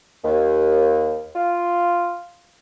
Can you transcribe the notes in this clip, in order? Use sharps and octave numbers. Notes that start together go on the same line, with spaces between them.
D#2
F4